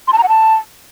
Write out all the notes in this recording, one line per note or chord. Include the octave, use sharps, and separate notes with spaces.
C6
A5
A#5
F#5
A5